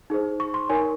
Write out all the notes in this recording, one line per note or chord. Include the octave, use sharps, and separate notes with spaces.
D#4 G#4 C5
C#6
C6
D#4 A#4 C#5 G#5